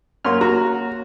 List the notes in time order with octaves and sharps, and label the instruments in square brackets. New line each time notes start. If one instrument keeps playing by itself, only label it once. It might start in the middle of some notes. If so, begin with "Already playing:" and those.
[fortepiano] F#2 C6 [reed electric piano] A#3 C#5 F6
[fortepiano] F#4 A#5